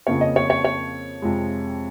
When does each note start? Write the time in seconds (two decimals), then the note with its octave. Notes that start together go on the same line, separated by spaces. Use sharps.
0.07 F2 C#3 F3 A#3 C#5
0.21 D#5
0.36 C#5
0.50 C#5
0.65 C#5
1.22 F2 C3 F3 G#3